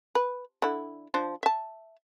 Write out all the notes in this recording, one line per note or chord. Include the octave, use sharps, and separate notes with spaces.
B4
D3 E4
F3 D4 C5
E5 A5